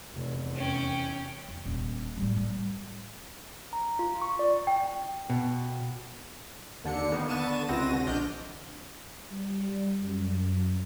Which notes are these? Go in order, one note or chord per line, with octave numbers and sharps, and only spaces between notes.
F1 E2
C#4 G5
F2
D#1
A2 G3
G3
A#5
F4
C#6
D5
G5
B2
D#2 D3 D4 C#7
D#3 A#3 B3 D#4
D3 B3 A5 C#6 D#7 E7
C#2 C3 C4 F#4 A#6 D#7
D3
A#1 D4 D#5 F6 G6 D7
G3
F#2